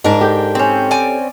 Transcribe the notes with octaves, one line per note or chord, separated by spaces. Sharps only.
G#2 D4 A#4
G4 A4 G5
C4 C#4
D5 G#5